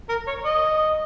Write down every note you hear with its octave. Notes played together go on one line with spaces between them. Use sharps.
A#4
C#5
D#5